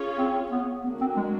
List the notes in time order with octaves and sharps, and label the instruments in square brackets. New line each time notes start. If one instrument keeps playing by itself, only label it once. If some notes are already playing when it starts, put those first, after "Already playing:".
Already playing: [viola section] C#4 F4 G#4 C#5
[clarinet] C4
B3
[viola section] D3 F#3 A#3 D4 F#4 [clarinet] B3
[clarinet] C4
G#3